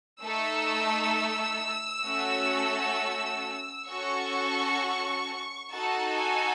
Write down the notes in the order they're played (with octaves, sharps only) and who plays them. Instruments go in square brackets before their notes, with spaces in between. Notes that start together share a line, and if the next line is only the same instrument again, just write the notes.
[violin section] A3 D#4 A4 E6
A3 C#4 F#4 A4
C#4 F#4 A4 C#6
D#4 F#4 A4 A5
G#5